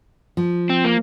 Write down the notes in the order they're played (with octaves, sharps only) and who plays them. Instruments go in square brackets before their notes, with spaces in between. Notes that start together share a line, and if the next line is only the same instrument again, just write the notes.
[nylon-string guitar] F3
[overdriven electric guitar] C4
A#3